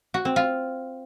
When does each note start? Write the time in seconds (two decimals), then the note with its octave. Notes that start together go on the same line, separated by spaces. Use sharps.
0.14 F#4
0.25 C4
0.36 F4